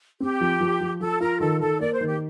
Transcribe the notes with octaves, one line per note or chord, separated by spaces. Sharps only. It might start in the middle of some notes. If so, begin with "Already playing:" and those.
C4 G4
F3
F3
F3
F3 A4
F4 A#4
D#3 A4
D#3 A4
A#3 D5
C5
D#3
G4